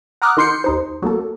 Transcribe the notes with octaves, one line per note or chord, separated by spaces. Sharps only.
F#5 A#5 D6 D#6 F6 F#6
D#3 D#4 C6 G6 C7 C#7
D#2 D#4 C5
F#3 A3 A#3 A4